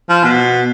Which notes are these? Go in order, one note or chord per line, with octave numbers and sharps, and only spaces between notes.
F3
B2